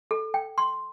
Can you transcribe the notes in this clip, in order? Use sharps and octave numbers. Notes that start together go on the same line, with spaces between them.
A4
G5
C6